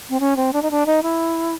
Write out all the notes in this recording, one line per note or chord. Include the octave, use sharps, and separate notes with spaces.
C4
C#4
C4
D4
D#4
D4
D#4
E4